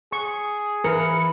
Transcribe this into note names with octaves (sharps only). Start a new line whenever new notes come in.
G#4 C#6
E3 A#4 B4 C#7